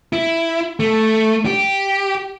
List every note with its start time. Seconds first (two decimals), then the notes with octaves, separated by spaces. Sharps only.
0.13 E4
0.80 A3
1.46 G4